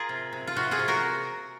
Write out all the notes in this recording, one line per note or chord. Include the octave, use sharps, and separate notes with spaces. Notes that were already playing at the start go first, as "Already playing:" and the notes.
Already playing: F4 G#4 A#4
C3
C3
F4
C3 F#4
F4 G#4
C3
F#4 A#4